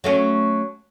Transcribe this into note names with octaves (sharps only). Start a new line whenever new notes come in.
F#3 A3 C#4